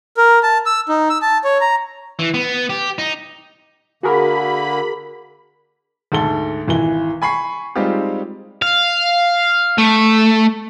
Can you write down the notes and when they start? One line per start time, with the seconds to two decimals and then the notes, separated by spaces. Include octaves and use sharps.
0.17 A#4
0.43 A5
0.66 E6
0.89 D#4
1.10 E6
1.22 A5
1.44 C#5
1.61 A#5
2.19 E3
2.34 B3
2.70 G4
2.98 D#4
4.03 D3 A#3 F#4 G#4 A#4 B5
6.12 D2 G#2 A4 G7
6.68 G#1 E3 G7
7.22 G#5 B5 C#6 C7
7.76 G3 G#3 C4 D#4 F4 G4
8.62 F5
9.78 A3